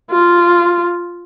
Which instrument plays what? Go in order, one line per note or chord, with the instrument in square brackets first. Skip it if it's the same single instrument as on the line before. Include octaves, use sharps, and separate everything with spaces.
[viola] F4